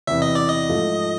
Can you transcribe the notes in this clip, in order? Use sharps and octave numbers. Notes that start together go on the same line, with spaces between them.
E2 C3 E3 E5
D#5
D5
D#5
G#2 F3 A3